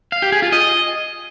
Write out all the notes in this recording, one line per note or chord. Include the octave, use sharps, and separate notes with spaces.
F5
G4
G#4
F4
D#5